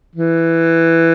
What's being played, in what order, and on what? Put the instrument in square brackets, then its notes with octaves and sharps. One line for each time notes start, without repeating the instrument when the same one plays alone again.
[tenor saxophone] E3